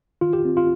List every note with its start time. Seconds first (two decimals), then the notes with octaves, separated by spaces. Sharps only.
0.21 D#3 F4
0.33 G4
0.45 C4
0.57 F4